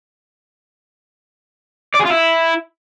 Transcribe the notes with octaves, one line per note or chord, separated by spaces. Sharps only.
D5
G#4
F4
E4